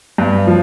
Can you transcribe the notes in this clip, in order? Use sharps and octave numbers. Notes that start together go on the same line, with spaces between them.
G2
F3